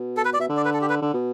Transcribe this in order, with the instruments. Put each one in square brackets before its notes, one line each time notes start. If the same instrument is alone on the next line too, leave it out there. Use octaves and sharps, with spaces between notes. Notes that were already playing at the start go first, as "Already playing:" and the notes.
Already playing: [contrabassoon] B2
[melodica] A4
B4
D5
[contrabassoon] B2 [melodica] E5
[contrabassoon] D3
[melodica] D5
B4
A4
G4
B4
[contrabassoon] D3
B2